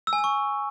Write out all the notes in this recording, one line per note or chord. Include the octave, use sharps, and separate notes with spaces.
E6
G#5
E6
C#6